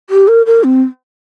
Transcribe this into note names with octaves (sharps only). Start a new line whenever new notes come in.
G4
A#4
A#4
C4